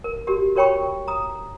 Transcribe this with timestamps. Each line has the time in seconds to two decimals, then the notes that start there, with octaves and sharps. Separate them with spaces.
0.04 A#4
0.27 F#4 G4 A#4
0.56 F#4 A#4 C#5 G5 B5 C#6
1.08 A#5 D#6